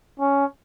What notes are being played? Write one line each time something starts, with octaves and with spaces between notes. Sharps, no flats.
C#4